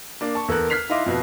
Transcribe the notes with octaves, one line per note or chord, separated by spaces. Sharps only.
A#3 D4
A5 C#6
E2 A4 A#4 F#6
F6 F#6 B6 C7 F7
D#4 E4 D#5 F5 C6 D6
F2 B2